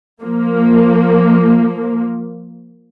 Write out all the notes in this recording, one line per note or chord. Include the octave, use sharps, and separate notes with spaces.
F3 A#3